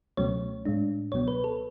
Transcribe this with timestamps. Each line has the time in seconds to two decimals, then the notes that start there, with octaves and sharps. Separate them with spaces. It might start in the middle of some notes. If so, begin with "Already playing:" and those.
0.17 C#2 B2 F#3 A3 C#4 C#5
0.65 A2 G#3 D4
1.12 C#2 B2 F#3 B3 C#5
1.28 B4
1.44 A4